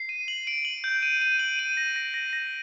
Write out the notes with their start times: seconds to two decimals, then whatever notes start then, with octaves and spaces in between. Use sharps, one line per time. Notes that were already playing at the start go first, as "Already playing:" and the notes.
Already playing: C7
0.09 D#7
0.28 F#7
0.47 D7
0.65 F#7
0.84 G6
1.03 D#7
1.22 D#7
1.39 F#7
1.59 D#7
1.77 A#6
1.96 A#6
2.14 A#6
2.33 A#6